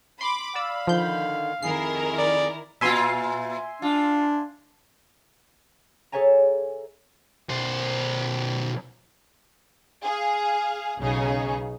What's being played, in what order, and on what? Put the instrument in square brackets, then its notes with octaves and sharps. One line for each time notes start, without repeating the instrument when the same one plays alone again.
[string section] B5 D6 [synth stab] C6
[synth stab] D5 E6 [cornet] F5 [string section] B5
[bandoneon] D3 D#3 [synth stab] F3 G6
[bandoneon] F2 G#4 [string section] D#3 E4 A#4 [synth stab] C7
[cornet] D5
[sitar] A#2 F4 [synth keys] E5 G#5 C6
[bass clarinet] D4 [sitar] F4
[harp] G#4 A4 C#5 E5 G#5 A#5
[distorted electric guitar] B1 C5
[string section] G#4 F5
B1 C#3 D#4 G#4